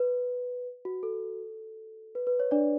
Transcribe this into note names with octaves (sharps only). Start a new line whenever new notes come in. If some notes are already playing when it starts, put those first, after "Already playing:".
Already playing: B4
F#4
A4
B4
B4
C#5
D4 D5